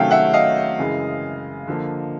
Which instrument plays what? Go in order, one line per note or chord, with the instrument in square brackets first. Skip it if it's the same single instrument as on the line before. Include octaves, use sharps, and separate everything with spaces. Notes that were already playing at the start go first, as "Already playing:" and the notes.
Already playing: [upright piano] C3 D#3 F#3 A3 C#4 F5 G5
E5 F#5
D#5 F5
F#2 C#3 E3 G#3
D3 F3 A#3